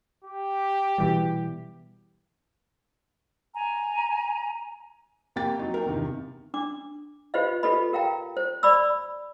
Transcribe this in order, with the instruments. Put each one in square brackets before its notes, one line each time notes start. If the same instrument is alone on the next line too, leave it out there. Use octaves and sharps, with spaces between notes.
[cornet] G4
[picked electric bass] B2 E3 G3
[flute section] G#5 A#5
[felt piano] F2 A#3 G4 G5 A6
F#3 D#4
A#4 G5
E2 G2 C3 D#3
[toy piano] D4 D6
F4 G4 B4 C5 D#5 F5
F4 G4 A4 B4 D#5 B5
G4 A#4 F5 G5 A#5
C5
D5 B5 D6 E6